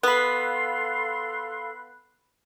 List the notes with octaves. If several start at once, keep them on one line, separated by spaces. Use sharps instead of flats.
B3 A4 F5 B5 C6 F#6